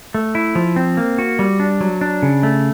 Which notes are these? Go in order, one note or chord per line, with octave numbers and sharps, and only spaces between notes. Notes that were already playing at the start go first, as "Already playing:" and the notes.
A3
E4
F3
C4
A#3
F#4
G3
D4
F#3
D4
C#3
A3